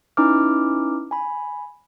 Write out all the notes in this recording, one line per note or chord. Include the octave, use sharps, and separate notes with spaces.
C#4 D#4 E4 B4 D6 F6
G#5 B5